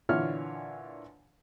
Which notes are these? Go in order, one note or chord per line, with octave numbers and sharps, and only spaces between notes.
A#2 D3 E3 C#5 E5 F6